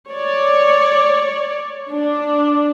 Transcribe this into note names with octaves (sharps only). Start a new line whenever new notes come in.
C#5 D5
D4